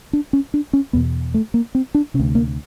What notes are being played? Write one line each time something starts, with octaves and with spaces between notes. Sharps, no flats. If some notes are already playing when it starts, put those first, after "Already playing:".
D4
C#4
D4
C#4
E2 B2 B3
A3
A#3
C4
D4
C3 C#4
D2
A#3